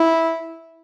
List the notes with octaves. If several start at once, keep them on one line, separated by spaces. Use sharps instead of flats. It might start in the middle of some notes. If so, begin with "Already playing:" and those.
Already playing: E4